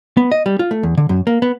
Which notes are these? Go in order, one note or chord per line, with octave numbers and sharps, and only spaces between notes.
B3
D#5
G3
F4
A3
E2
D3
F#2
A#3
B3